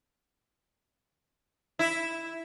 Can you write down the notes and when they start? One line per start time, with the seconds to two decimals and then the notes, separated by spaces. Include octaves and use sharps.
1.79 E4